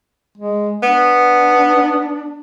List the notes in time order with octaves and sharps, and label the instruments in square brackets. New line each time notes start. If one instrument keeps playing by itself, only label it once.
[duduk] G#3
[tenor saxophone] B3 [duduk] D4